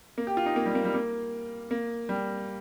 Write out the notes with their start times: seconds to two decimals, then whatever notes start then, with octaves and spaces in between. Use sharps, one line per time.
0.18 A#3
0.27 G4
0.37 F4
0.46 D#4
0.56 A#3
0.66 G3
0.75 A#3
0.85 G3
0.95 A#3
1.71 A#3
2.09 G3